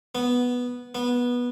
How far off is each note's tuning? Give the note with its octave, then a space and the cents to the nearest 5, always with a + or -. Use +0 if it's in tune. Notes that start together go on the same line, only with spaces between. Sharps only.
B3 -5
B3 -15